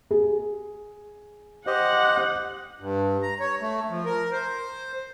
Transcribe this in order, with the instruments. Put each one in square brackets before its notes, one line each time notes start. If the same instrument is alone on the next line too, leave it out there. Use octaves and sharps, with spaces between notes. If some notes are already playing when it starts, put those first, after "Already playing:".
[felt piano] G#4
[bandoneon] G4 C5 D#5 [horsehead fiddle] F#5
[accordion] G2
A#5
C#5
A3
F3
A#4
C5